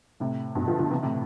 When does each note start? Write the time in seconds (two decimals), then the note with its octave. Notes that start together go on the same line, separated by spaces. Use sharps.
0.20 A2 C3
0.55 G2 B2
0.68 D3 F3
0.79 D3 F3
0.90 C3 E3
1.02 A2 C3